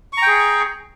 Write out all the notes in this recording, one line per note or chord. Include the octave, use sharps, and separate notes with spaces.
G#4 G5 A#5 C#6